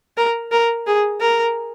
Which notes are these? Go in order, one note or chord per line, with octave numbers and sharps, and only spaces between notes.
A#4
A#4
G#4
A#4